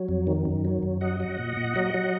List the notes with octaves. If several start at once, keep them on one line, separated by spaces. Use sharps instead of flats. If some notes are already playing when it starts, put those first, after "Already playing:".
Already playing: F#3
F2
D#3
F#2
F#3
F#2
F#3 D#5 F#5
F#3
A#2
A#2
F#3
F#3